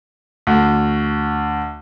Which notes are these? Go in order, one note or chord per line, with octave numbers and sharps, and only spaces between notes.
D2